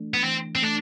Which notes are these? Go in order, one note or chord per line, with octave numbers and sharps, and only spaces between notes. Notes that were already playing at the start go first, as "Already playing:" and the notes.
Already playing: E3 A3 D4
B3
E3 C4
C4
A3 D4